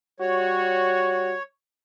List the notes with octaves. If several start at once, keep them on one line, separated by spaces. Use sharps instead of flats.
G3 F#4 C#5